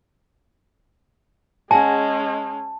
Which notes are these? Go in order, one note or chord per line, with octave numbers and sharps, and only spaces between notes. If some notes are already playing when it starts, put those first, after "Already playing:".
G#3 C#4 G#4 D#5 F#5 G#5 A5